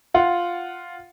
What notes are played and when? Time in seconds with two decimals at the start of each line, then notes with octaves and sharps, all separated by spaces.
0.14 F4 F#5